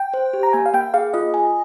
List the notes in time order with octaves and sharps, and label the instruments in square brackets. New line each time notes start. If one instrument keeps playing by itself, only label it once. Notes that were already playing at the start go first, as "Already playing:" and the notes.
Already playing: [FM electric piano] G5
[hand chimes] C5
G4
[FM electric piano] A#5
[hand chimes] A#3 [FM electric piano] G#5
[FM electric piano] F5
[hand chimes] A#3 [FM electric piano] G5
[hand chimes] G#4 [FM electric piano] F5
[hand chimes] F4 [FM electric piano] D#5
[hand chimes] G#5